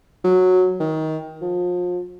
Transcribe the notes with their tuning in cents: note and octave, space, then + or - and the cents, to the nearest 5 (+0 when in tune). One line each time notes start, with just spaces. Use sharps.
F#3 -10
D#3 +20
F3 +35